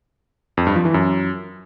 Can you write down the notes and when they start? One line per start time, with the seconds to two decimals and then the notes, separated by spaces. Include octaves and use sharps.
0.57 F2
0.67 G2
0.76 F3
0.85 E3
0.94 F#2